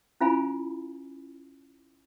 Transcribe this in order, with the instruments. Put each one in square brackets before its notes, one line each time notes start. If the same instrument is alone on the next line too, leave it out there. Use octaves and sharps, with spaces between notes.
[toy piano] C#4 E4 F4 F5 G#5 B5